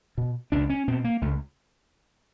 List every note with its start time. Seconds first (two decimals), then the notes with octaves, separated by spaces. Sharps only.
0.18 B2
0.52 C#2 D4
0.70 C#4
0.88 B2 C4
1.04 A#3
1.22 C#2 A3